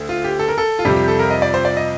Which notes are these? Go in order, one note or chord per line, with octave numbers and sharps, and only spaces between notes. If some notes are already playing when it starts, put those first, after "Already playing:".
Already playing: D2 D3 A3
F4
G4
A4
A#4
A4
F4
F2 C3 G3 G4
G4
A4
A#4
D#5
D5
C5
D5
D#5